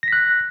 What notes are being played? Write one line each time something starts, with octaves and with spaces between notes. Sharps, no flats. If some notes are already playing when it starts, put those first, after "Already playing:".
F#6 A#6 B6